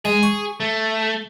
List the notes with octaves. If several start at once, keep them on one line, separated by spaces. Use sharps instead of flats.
G#3 G#4
C#6
A3